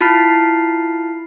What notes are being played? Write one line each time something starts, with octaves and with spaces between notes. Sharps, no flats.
E4 F4 A5 B5 F6 C7